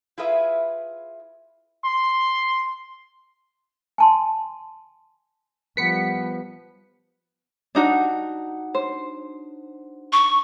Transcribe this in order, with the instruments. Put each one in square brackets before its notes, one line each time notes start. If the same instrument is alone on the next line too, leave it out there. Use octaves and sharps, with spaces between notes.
[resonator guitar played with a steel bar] E4 F4 G#4 B4 E5
[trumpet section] C6
[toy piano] G#5 A5 C6
[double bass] F3 G3 [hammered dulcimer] B3 B4 [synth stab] B6 C#7
[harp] D4 D#4 F#4
C5
[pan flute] C#6